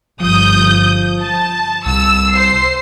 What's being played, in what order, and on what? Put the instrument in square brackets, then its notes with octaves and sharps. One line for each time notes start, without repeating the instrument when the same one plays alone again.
[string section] G1 D#6 G6 [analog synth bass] F3
[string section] A5
[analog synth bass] C2 [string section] E6
[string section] C5 C7